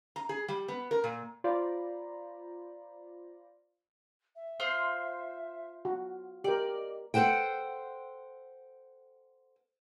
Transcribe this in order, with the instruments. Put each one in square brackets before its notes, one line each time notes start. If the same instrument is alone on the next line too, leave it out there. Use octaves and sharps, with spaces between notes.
[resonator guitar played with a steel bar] A#5
G#4
G3
B3
A#4
A#2
[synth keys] F4 C5 D5 A#5 B5
[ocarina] E5
[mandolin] F4 C5 D#6
[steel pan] F#4
[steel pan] G4 A#4 [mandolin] D5 [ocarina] D#5
[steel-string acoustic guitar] A4 A#4 C5 F#5 G5